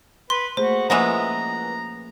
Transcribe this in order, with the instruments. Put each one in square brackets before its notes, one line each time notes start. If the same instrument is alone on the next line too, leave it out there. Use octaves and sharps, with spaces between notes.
[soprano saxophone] B4 [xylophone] C6
[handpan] A3 A#3 G#4 [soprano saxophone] F#4 [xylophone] C5
[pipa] E3 G#3 B3 [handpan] F3 A#3 C#4 [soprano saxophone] A#5